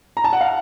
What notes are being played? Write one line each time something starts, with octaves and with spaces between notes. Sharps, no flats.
A#5
A5
F#5
F5